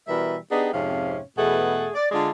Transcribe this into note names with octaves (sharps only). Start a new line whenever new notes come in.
B2 E3 G3 A#4 E5
B3 D4 D#4 G4 G#4
F2 G#2 C3 C#4 F5
E2 B2 A3 G#4 F#5
D5
D3 G#3 D4 F4 D5